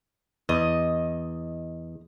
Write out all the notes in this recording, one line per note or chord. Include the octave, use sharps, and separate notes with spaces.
E2 D#5